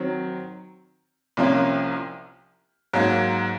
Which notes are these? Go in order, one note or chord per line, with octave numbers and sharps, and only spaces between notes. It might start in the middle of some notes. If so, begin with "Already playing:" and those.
Already playing: D#3 F#3 C4
C2 C3 F3 A#3 C#4
G#2 F#3 A#3